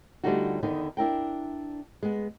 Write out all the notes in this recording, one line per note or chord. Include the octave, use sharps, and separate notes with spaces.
D3 G3 A3 D#4 F4 F#4
E2 D3 D#3 B3 D#4
D4 E4 A#4 G5
G#3 B3